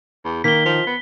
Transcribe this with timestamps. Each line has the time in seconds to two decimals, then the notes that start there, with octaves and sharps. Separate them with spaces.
0.24 E2
0.44 D#3 A#3 B6 G7
0.66 F3
0.86 B3